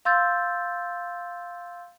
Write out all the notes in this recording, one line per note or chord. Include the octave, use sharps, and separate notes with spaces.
F5 C6 E6 G6 A6